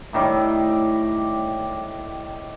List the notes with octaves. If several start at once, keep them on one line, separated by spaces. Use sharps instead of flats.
A2 D#3 G3